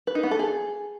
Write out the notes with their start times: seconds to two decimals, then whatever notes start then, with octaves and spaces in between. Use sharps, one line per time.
0.07 B4
0.15 D#4
0.23 B3
0.31 A4
0.39 G#4